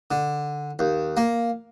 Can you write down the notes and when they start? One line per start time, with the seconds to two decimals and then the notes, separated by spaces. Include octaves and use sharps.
0.11 D3
0.79 D#2
1.17 A#3